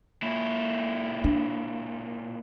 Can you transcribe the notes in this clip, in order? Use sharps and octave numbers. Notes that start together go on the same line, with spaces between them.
A#2 E4
D4